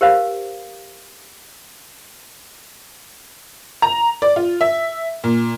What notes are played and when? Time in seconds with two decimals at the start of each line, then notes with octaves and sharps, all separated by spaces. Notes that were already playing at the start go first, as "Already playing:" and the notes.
0.01 G4 A#4 C5 F5
3.82 A#5
4.22 D5
4.36 F4
4.61 E5
5.24 A#2